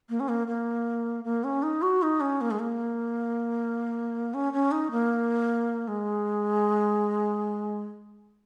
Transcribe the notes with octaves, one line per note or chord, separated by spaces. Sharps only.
A#3
C#4
A#3
A#3
A#3
C#4
D#4
F#4
D#4
C#4
A#3
G#3
A#3
C#4
C#4
D#4
A#3
G#3